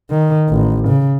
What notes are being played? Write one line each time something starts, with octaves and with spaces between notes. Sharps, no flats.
D#3
A1
C#3